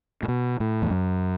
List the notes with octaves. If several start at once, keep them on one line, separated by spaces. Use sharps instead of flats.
A2
B2
A2
E2
F#2